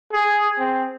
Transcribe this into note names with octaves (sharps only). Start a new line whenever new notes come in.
G#4
C4